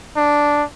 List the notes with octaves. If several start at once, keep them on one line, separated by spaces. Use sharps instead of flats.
D4